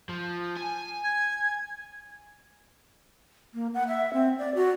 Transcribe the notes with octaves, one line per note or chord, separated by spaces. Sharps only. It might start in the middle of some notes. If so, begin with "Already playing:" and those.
F3
G#5
G#6
A#3
F#5
E5
C4
D5
F#4